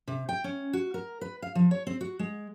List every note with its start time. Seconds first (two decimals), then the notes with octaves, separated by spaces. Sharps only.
0.08 C3
0.29 G5
0.44 C#4
0.73 F#4
0.94 A#4
1.21 B4
1.42 F5
1.55 F3
1.71 C#5
1.87 C4
2.01 F#4
2.19 G#3